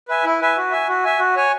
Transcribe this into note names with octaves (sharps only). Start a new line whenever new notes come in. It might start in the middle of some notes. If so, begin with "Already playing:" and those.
B4 E5 G#5
E4
B4 E5 G#5
F#4
E5 G#5
F#4
E5 G#5
F#4
C#5 G#5